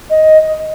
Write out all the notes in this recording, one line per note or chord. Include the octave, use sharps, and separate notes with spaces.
D#5